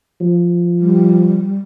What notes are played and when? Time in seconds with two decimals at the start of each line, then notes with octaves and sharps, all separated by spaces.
0.21 F3
0.80 G3